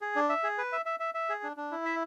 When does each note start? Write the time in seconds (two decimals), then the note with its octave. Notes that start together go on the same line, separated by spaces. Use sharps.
0.01 G#4
0.16 D4
0.29 E5
0.43 G#4
0.58 B4
0.72 E5
0.85 E5
1.00 E5
1.14 E5
1.29 G#4
1.43 D4
1.57 D4
1.71 E4
1.85 E5